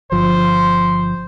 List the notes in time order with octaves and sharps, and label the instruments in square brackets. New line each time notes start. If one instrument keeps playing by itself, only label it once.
[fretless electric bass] G1 F3 [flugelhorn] C5